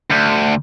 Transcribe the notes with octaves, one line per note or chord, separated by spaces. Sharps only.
D2